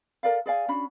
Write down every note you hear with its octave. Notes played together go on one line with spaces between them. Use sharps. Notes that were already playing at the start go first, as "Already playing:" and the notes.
A4 A#4 D5 F5
G#4 D5 F5 G#5
C#4 D4 F#4 B5